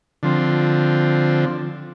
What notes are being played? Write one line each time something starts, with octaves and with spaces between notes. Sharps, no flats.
D3 F3 C4